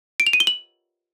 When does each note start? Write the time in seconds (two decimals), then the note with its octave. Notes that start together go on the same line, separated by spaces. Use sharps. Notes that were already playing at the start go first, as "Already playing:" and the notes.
0.20 D7
0.27 F7
0.33 D#7
0.40 G7
0.47 F#7